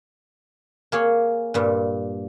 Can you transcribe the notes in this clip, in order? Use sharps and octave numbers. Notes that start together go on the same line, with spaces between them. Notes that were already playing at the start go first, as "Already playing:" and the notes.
A#3 G#4 C#5
G2 A#2